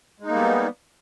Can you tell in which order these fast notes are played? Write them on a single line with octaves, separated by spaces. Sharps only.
G#3 D#4 A#3 G3 B3